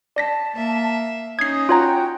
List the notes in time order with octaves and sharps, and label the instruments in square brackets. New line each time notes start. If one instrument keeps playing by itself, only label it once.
[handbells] D5 A#6 B6 [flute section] A5
[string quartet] A#3 E5
[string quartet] C#4 D#4 [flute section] D#6 [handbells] G#6 C7
[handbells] F4 C#5 A#5 [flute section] F#4 G5